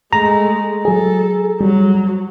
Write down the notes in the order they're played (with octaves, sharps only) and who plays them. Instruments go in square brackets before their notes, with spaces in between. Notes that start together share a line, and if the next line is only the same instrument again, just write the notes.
[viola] G#3 A3 [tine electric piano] A#5
[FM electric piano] F#3 G#4 [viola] A4
[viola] F#3 [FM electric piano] G3